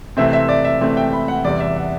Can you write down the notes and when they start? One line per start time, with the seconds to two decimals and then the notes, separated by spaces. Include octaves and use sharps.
0.17 C3 E3 A3 C4 E5
0.33 E5
0.49 D5
0.64 E5
0.80 C3 E3 A3 C4
0.97 G5
1.13 B5
1.28 F#5
1.44 E2 C3 E3 G3 D5
1.60 E5
1.76 F#5